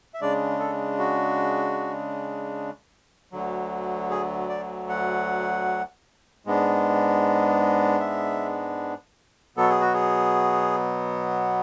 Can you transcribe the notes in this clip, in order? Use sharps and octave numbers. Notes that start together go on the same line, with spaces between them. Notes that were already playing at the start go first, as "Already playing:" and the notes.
E5
C#3 G#3 D4 D5
A4
F#4
D2 D3 F#3
G#4
D5
F#5
G#2 G#3 B3 D4
E5
B2 F#3 B3 A4
G#4
F#4
G#4